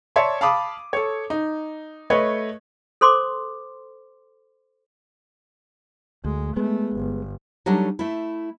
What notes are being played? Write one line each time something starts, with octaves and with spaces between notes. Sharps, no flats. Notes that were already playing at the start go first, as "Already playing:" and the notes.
C#5 D5 E5 A5 C6
F5 A5 B5 D6 D#6
A4 C#5
D#4
A3 B4 C#5 D#5
A4 C5 C6 D6
D2 G#3
G#3 A3 B3
G1
F#3 G3 A3 D4 D#4
A3 E4